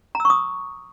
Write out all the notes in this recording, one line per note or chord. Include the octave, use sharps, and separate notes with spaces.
A#5
E6
C#6
D#6